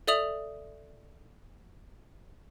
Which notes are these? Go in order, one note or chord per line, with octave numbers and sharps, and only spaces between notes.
A4 D5 E5 D#6 F7 F#7